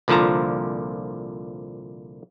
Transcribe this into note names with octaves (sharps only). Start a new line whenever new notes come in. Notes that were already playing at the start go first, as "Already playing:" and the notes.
C2 A#2 D3 F3 A5 A#5